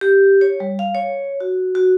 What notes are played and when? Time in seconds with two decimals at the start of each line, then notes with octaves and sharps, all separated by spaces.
0.01 G4
0.41 C#5
0.60 G3
0.79 F5
0.95 C#5
1.40 F#4
1.75 F#4